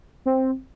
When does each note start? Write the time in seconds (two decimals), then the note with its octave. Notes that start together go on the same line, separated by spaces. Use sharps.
0.26 C4